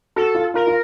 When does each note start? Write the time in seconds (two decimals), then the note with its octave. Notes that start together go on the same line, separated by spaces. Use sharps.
0.16 F#4 A4
0.35 F4
0.54 F4 A#4
0.67 F4